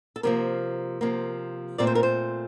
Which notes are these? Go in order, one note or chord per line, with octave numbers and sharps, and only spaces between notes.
A4
C3 F3 A#3 A#4
C3 F3 A#3
A#2 A3 C4 D5
C5
A#4
C5